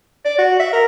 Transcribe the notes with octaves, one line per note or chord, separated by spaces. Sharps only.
D5
F#4
E5
A#4